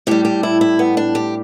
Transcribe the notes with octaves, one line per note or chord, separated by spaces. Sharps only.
A2 G3 G4
G4
E4
E4
B3
D4
G4